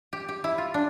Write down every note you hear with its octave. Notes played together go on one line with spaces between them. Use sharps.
G4
G4
E4
F4
D4